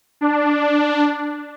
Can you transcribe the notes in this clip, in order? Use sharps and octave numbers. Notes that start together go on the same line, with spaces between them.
D4